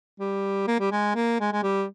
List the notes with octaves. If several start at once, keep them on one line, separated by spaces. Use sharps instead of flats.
G3
A#3
G3
G#3
A#3
G#3
G#3
G3